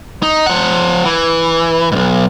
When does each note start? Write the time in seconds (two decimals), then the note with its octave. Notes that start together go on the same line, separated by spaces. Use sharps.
0.23 D#4
0.46 F3 F#5
1.05 E3
1.92 B1 G#2